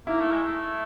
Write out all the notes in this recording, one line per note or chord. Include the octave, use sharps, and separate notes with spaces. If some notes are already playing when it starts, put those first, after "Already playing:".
A#3 E4
A3
G#3
A3